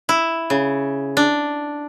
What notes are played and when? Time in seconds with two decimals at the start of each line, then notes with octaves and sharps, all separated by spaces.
0.09 E4
0.50 C#3
1.17 D4